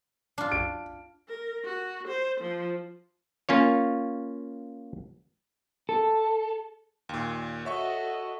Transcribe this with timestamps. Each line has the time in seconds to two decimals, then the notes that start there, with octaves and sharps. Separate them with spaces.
0.38 D4 F4
0.52 D7
1.29 A#4
1.65 F#4
2.08 C5
2.41 F3
3.49 A#3 C#4 F4 C#5
5.89 A4
7.09 D#2 A#2
7.65 F#4 A4 C#5 D#5 E5 C#6